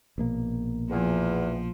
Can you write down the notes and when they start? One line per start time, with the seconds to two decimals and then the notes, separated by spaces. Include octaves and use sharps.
0.18 A#1 B2 A#3
0.90 E2 F3